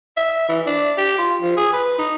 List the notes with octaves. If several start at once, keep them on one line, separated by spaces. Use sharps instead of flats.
E5
E3
D4
G4
F4
F3
G#4
B4
D#4